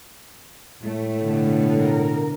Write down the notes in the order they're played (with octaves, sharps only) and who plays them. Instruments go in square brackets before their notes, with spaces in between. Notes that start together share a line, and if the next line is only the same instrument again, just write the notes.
[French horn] A2 [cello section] A3
[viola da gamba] B2 D3
[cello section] A#4